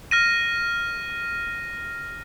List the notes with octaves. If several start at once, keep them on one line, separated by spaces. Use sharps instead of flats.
F6 A#6 D#7